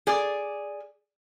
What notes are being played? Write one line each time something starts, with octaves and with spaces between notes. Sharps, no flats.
G#4 D5